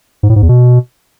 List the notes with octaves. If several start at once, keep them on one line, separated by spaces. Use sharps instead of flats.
G#2
A2
G#2
E2
B2